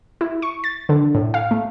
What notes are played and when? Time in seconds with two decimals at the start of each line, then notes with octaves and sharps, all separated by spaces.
0.21 E4
0.42 C#6
0.64 A6
0.89 D3
1.15 A2
1.34 F5
1.51 A3